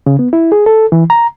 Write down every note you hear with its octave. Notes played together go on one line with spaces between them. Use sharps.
C#3
B3
E4
G#4
A4
E3
A#5